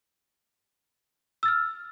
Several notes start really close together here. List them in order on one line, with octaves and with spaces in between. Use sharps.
E6 A6 F6